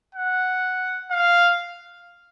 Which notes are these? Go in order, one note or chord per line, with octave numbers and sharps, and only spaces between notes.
F#5
F5